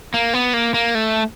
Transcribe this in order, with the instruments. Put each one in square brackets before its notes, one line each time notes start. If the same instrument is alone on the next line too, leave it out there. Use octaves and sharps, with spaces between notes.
[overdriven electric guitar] A#3
B3
A#3
A#3
A3